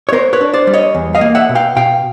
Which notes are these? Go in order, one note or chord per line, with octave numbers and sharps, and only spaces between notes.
C#5
B3 A#4 C5
B4 C#5
D4
C5 D5
G3
C#5 D#5
E2
D#5 F5
A#3
E5 F#5
B2
F5 G5
B2 F5 G5